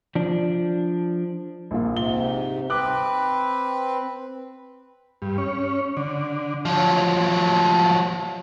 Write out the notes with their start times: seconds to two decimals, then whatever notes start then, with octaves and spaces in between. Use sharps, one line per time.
0.15 F3 D4
1.71 A#1 A#2 F4
1.97 G#2 C3 G7
2.70 C4 B4 D6 F#6
5.22 G2
5.38 C#4
5.97 D3
6.65 F3 F#3